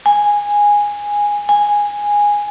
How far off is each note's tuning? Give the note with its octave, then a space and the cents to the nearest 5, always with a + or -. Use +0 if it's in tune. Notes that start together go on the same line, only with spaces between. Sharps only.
G#5 -10
G#5 -10